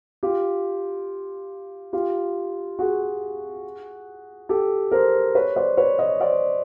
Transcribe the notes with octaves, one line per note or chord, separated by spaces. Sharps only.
F4 G4
F4 G4
F#4 G#4
G4 A4
A#4 C5
B4 C#5
C5 D5
B4 C#5
C#5 D#5
C5 D5